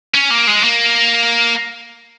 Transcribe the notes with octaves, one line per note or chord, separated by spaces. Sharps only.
C#4
A#3
G#3
A#3